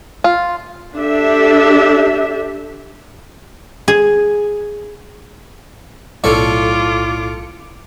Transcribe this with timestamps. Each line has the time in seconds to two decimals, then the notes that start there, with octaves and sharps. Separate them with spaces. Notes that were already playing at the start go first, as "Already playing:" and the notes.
0.24 F4
0.97 D4 G4 A4 E5
3.88 G#4
6.24 B1 A2 F4 A4 C#5 D5 D6 C#7